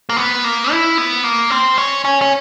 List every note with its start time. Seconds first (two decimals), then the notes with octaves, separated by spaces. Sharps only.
0.09 A#3
0.17 B3
0.44 A#3
0.71 E4
0.98 B3
1.24 A#3
1.50 C4
1.77 C#4
2.05 C#4
2.22 C#4